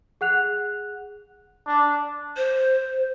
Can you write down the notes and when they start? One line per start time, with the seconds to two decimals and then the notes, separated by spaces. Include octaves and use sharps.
0.21 G#4 F#5 F#6 F7
1.67 D4
2.37 C5